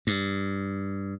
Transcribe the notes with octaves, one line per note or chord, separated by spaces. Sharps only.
G2